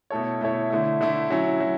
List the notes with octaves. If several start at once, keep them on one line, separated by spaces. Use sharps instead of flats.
B2 A3 E4 A4 C#5
B2 A3 E4 A4 C#5
D3 A3 E4
D3 A3 E4
F#3 C#4 E4
F#3